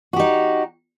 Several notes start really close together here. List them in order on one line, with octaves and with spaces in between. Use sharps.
F#4 G4 D#4